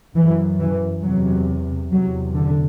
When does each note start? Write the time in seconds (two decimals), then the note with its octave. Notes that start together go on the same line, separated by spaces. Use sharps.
0.16 F#2 E3
0.59 E3
1.03 E2 C3 F#3
1.91 E2 C3 F#3
2.35 D3